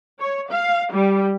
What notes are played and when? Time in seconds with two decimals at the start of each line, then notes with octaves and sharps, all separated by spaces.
0.19 C#5
0.50 F5
0.91 G3